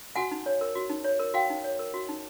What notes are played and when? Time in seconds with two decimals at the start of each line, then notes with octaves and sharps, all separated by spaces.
0.16 F#4 F#5 G#5
0.32 D#4
0.46 C#5
0.61 A#4
0.75 F#4
0.90 D#4
1.04 C#5
1.19 A#4
1.34 F#4 F5 G5
1.50 D#4
1.64 C#5
1.79 A#4
1.94 F#4
2.09 D#4